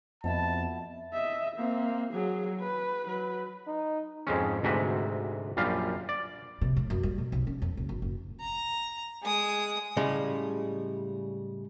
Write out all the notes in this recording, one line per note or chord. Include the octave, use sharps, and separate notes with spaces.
F2 B2 E4 A5 B5
D#5 E5
A#3 C4
F#3 G#4
B4
F#3 B4
D#4
F2 G#2 G#3 C#4
D2 G#2 C3 F#4 B4
A#1 F#2 G3 F4 F5
D5
C3
A2
F#2
G3
B2
B1
C#4
F2
C#2
G#1
F#1
A#5
G#3 D#6
A2 C#3 G3 G#3